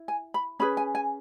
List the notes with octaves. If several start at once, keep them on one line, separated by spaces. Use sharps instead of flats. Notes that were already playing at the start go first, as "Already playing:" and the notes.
Already playing: E4
G#5
B5
C#4 G#4 B4 B5
G#5
G#5